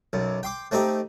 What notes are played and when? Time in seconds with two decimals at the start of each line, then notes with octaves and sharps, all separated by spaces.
0.13 B1 F#2
0.43 G5 C6 D6
0.71 A3 C4 D#4 G4